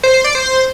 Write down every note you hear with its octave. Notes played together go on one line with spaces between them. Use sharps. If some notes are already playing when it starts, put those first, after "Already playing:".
C5
C5
D5
C5